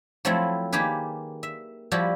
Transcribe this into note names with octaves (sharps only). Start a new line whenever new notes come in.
F3 F#3 A3 C4 E4
D#3 A#3 G4 G#4 B4
E5
F3 G3 E4 F#4 G4